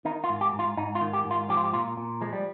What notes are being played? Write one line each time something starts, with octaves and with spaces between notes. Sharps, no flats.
D#3 D#4
F4
G#2
G4
G#2
F4
G#2 D#4
F4
D#3
G4
G#2
F4
F3 G4
F4
G4
A#2 F4
A#2
F3 G#3
G3